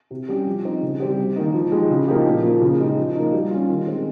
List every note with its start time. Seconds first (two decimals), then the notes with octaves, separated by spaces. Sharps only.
0.11 C3
0.28 G3 C#4 G4
0.46 F3
0.65 C4 D#4
0.82 C#3
1.00 G3 C4 G4
1.18 C3
1.36 D#3 A#3 D#4
1.54 F3
1.72 G#3 D#4 G4
1.90 C#3
2.08 F3 A#3 D#4 G4
2.26 A#2
2.43 F3 A#3
2.62 C#3
2.79 G#3 D#4 G4
2.98 F3
3.15 A#3 D#4
3.33 G3
3.51 C#4 F4
3.69 D#3
3.87 G#3 C4 G4